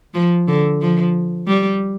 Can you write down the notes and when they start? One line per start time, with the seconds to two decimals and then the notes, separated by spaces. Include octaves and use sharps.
0.14 F3
0.48 D3
0.81 F3
1.47 G3